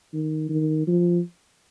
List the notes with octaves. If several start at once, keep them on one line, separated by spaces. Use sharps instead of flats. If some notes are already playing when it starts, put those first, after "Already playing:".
D#3
D#3
F3